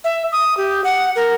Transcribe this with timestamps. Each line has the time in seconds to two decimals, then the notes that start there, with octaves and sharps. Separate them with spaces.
0.04 E5
0.32 D#6
0.57 G4
0.84 F#5
1.16 A#4